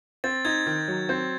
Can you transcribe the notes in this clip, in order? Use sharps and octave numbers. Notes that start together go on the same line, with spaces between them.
C4 A6
D#4 G#6
D#3
F#3
C4